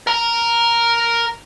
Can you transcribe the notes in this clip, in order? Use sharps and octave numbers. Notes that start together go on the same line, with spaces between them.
A#4 A#5